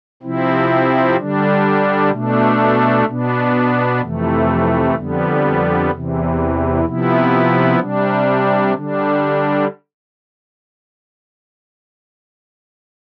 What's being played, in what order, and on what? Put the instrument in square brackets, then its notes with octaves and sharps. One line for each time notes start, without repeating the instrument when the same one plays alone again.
[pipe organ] C3 F3 C4 E4
D3 G3 D4
B2 A3 D4
B2 B3 D4
F2 C3 E3 A3
F2 D3 G3 B3
E2 C3 E3
C3 F3 B3 E4
C3 G3 D4
D3 G3 D4